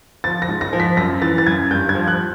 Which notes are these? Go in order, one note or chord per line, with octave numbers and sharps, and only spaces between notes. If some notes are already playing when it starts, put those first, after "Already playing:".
F3 A6
A#6
G#2
A#6
F3
B6
F#2 A#6
E3 A6
A6
F#2 G#6
G2 G6
G#6
F3
F#6